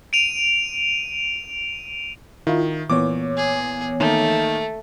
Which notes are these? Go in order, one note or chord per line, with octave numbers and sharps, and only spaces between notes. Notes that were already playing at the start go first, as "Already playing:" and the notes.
D7 D#7 F7
D#3 E4 F4
A#2 E3 B3 C#5 D6
G#4
D#3 A3 A#3 D#4